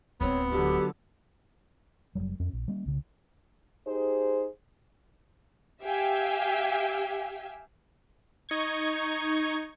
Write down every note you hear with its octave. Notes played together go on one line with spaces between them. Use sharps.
D1 G#3 B3 C4 C#5
D3 F#3 G4
F#1 E2 F#3 G3
F2 C#4
A#1
G3 A#3 C#4
C2 C#3
D#4 G4 G#4 C5
G4 E5 F5 G5 G#5
D#4 C#6 G#6